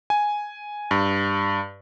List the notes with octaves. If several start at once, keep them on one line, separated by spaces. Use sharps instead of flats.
G#5
G2